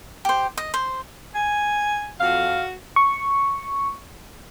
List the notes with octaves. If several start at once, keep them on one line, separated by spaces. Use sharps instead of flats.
G4 C5
D#5
C5
G#5
F2 F#4 F5
C#6